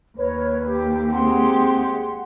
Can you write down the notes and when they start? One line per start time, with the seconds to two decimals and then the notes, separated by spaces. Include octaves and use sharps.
0.18 D#2 A#4 B4 C#5
0.64 G4
1.12 G#3 C4 G4 F#5 C6